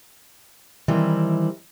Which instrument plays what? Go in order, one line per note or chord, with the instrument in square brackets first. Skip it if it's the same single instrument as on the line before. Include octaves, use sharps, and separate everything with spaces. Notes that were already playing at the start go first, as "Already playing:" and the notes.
[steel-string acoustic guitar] D#3 E3 G3 C4 E4